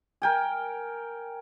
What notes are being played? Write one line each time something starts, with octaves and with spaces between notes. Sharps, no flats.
A#4 G5 G#5